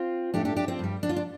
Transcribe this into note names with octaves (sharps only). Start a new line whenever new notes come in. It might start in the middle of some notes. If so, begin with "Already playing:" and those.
Already playing: C4 F4
A2 A3 D4 G4
D4 G4
D4 G4
C4 F4
G2 G3
D4
F4
D4